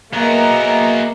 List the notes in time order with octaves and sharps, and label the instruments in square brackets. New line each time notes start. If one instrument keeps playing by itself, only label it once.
[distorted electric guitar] F#3 B3 [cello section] A#3 [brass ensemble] G#4 D#5 E5 [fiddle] A#4 A#5